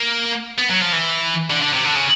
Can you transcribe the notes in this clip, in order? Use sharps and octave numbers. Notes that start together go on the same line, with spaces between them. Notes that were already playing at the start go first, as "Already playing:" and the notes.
Already playing: A#3
B3
F#3
F3
E3
D3
D3
C3
D3
C#3